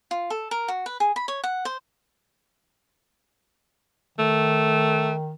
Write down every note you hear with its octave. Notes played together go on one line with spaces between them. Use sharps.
F4
A4
A#4
F#4
B4
G#4
B5
C#5
F#5
C5
D#3 A3